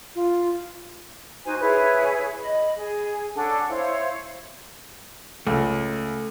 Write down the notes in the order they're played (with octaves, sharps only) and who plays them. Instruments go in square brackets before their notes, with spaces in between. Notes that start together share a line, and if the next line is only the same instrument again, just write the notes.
[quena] F4
[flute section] D#4 F#4 C5 G#5
E4 G#4 B4 C#5
D#5 B5
G#4
C#4 D4 A4 F#5
E4 C5 C#5 F5
[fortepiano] C#2 [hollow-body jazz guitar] A3